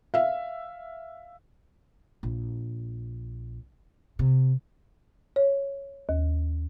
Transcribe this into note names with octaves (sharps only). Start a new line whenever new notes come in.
E5 F5
A#1
C3
C#5
D#2